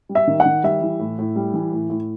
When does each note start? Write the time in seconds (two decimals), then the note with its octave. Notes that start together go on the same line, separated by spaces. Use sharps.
0.09 G3
0.15 E5
0.27 D#3
0.40 F#5
0.46 D#3
0.64 G3 E5
0.81 E3
0.99 A2
1.18 A2
1.36 G3
1.54 E3
1.72 A2
1.90 A2